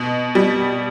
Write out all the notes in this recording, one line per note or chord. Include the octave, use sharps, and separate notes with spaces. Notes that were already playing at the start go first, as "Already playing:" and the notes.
Already playing: B2
G3